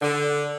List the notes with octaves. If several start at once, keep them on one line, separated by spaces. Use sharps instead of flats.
D3